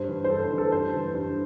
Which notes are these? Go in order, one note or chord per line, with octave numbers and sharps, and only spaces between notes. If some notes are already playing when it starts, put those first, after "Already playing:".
Already playing: G2 C5
E3
C5
G2 A4
C5
E3
A4
G2 C5
E3
G2